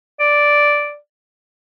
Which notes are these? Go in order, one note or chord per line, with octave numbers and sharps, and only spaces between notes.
D5